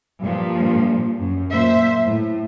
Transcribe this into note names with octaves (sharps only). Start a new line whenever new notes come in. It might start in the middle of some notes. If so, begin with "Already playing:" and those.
G2 A#2 F3
F#2
A#2 C5 E5
A2